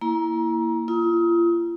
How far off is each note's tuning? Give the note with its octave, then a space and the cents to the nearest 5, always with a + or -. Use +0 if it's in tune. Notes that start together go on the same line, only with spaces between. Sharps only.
A#3 +0 E4 +0 A#5 +25
F4 -35 D#6 +35